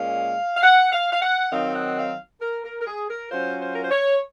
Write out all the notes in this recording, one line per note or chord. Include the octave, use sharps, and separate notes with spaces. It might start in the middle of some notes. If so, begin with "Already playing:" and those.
Already playing: A#2 G#3 C#4 F5
F5
F#5
F5
F5
F#5
D#3 F#3 C4 D#4 F5
F#5
F5
A#4
A#4
A#4
G#4
A#4
F#3 C#4 F4 C5
C5
A#4
C5
C#5